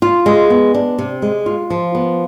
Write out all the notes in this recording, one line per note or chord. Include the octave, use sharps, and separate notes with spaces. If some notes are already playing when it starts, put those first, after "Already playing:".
F4
G#3
B3
D4
C3
G#3
F4
F3
B3